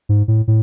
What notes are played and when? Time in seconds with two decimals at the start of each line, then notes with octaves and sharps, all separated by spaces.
0.09 G#2
0.28 A2
0.48 A2